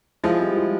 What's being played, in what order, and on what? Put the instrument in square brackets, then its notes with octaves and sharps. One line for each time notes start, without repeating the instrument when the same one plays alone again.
[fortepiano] F3 G#3 [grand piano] E4
[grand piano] G3
E4